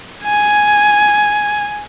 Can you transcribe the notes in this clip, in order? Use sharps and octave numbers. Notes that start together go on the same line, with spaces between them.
G#5